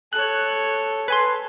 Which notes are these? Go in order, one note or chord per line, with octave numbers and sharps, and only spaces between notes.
A4 C#5 F#6
A4 B4 G#5 C6